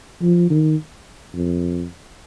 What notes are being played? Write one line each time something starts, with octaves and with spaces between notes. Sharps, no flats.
F3
D#3
F2